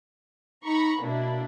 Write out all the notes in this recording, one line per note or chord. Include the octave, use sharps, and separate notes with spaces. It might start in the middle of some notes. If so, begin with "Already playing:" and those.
D#4 A#5 B5 C#6
B2 A#3 D4 E4